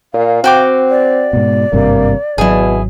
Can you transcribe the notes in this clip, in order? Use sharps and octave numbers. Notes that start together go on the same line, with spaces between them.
A#2 F5
C4 F#4 G5 D6
D5
G#2 B2
G#1 G2 C3 A#3
G#1 B2 F#3 E4 G#4